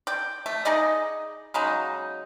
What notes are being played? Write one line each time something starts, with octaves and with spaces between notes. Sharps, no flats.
D5 G5
A3
D#4 G#4 D5 D#5
C#3 F#3 G#3 D#4